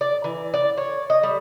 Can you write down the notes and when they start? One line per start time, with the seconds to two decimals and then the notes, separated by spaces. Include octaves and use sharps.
0.01 D5
0.24 E3
0.54 D5
0.78 C#5
1.10 D#5
1.23 G3